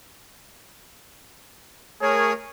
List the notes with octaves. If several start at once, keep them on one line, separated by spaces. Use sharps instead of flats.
A3 G#4 A#4 C#5